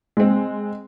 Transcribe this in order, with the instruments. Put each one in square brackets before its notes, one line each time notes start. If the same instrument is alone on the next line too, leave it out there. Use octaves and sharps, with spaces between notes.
[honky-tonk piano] G#3 C4